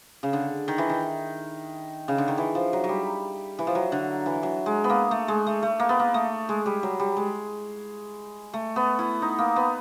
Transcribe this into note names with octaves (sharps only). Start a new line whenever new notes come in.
C#3
D3
D#3
E3
D#3
C#3
D3
D#3
E3
F3
F#3
F#3
G3
E3
F3
F#3
D3
E3
F#3
G#3
B3
A#3
A3
G#3
A3
A3
A#3
B3
A#3
A3
G#3
G3
F#3
G3
G#3
A3
B3
E4
D#4
A#3
B3